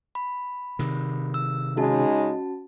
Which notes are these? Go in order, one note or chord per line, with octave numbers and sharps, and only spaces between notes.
B5
C3 D#3
E6
C#3 G#3 C#4 D#4 F#4 A5